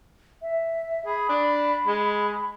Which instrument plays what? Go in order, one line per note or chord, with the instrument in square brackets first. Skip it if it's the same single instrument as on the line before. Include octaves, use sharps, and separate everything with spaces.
[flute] E5
[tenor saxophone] G#4 [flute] B5
[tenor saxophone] D4
G#3